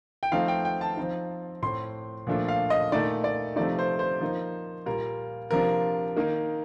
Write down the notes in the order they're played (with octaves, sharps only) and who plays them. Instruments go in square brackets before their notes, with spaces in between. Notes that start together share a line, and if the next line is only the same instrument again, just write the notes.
[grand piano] G5
F3 A3 C4 D#4 F5
G5
G5
A5
F3 C4 D#4
A2 A3 C4 C6
A#2 F3 A3 D4 F4
F5
D#5
A#2 A3 D#4 D5
D5
C3 F3 A3 D#4 D5
C5
C5
F3 A#3 D#4
A#2 G3 A#3 F4 A#4
C3 F3 A#3 D4 F4 A#4
D#3 A#3 D#4